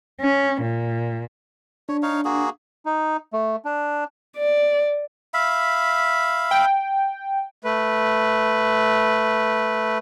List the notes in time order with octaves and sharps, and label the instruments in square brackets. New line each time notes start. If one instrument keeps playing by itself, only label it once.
[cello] C#4
A#2
[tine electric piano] D4 [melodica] C#5
[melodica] D#4 C#5 F5
A#3 F#4 G#4
[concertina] D#4
A3
D4
[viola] D5
[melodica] E5 F5 B5
[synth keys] G5
[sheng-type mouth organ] A3 B4